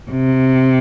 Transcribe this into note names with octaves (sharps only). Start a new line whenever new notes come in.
C3